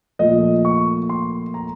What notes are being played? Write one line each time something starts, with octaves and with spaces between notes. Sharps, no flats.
A#2 F3 A3 D#5
C#6
C6
A#5